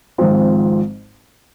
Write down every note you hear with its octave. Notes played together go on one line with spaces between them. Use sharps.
G#1 G#2 F3 C4 F4